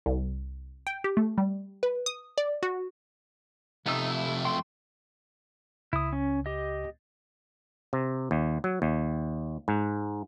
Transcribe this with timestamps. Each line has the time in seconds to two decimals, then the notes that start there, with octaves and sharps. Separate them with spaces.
0.06 C2
0.87 G5
1.04 G4
1.17 A3
1.38 G3
1.83 B4
2.06 D#6
2.38 D5
2.63 F#4
3.86 F2 C3 A3 B3 D#4 E6
4.10 E4
4.45 F#4 G5 C6
5.93 C#2 E4 D#6
6.13 C#4
6.46 G4 D#5
7.93 C3
8.31 D#2
8.64 F#3
8.82 D#2
9.68 G#2